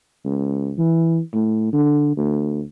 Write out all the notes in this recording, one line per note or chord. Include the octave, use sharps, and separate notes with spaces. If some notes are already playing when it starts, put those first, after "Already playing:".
C#2
E3
A2
D3
D2